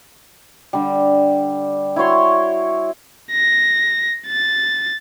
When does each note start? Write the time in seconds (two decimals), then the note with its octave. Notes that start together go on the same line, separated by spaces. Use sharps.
0.73 D3 G3
1.96 E4 F#4 C#5 C6
3.32 A#6
4.27 A6